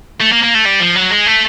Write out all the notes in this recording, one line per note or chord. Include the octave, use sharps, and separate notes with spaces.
A3
A#3
A#3
A3
G3
F3
F#3
G#3
A3